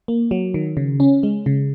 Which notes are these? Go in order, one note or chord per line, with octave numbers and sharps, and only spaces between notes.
A#3
F#3
D#3
C#3
C#4
G#3
C#3